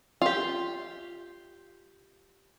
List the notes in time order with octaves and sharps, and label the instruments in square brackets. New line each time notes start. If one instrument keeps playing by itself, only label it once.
[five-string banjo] F4 G4